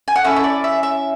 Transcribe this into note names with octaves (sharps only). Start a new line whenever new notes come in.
G#5
F#5
C#4 E4 A4 E5
E5
D5
E5
E5